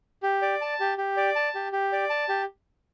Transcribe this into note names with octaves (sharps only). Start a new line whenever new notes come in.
G4
D5
A5
G4
G4
D5
A5
G4
G4
D5
A5
G4